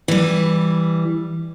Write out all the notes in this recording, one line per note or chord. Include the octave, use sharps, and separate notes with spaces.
E3 G3